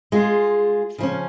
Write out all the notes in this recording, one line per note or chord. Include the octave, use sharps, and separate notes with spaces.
G#3 F4 G#4
C#3 F3 C#4